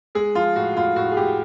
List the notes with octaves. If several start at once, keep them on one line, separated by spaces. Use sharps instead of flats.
G#3 G#4
F3 F4
A2 F#4
A2 F4
A2 F#4
G#4
A2 G4